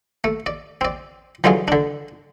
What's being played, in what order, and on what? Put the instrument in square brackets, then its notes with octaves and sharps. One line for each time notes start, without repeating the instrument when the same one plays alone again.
[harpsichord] A3
D5
C4 D5
D3 E3 F#3 G#3 F4 G#4
D3 D4